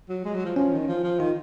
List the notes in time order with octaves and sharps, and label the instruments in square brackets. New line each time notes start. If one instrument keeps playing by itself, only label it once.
[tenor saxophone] F#3
G#3
F#3
F3
[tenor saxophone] F3 [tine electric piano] C#4
[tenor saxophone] D#3
F3
F3
[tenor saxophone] D#3 [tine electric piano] F4